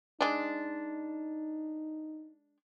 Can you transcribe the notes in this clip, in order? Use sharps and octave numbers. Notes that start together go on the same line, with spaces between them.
G#3 D4 D#4